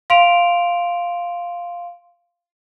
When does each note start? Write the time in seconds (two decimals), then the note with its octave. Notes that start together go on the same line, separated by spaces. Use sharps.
0.10 F5 C6 D7 F7